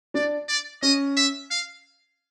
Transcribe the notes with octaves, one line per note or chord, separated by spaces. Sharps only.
D4 D5
D5
C#4 D#5
E5
F5